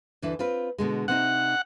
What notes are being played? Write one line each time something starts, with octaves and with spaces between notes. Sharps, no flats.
D2 E3 D4
C4 F4 B4
B2 D3 G#3
C3 C4 D#4 F#5